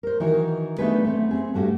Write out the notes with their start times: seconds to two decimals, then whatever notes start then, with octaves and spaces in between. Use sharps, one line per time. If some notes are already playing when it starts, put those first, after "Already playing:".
0.03 A#4 C5
0.20 D#3 E3 D#4 F#4
0.78 A3 B3 D4 D#4 G#4 B4
1.04 A3 C4 C#4
1.31 C4 G#4
1.54 G2 A3 F#4 G4